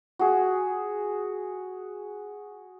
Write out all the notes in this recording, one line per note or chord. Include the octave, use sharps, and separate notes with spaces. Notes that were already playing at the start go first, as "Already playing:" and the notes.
F#4 G#4